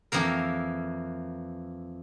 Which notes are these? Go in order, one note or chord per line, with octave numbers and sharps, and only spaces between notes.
F2 E3 A#3 A#4